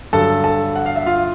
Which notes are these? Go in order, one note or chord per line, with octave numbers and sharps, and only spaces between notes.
G2 D3 F#3 A4 A5
A4 A5
F#5
F5
E5
F4 F5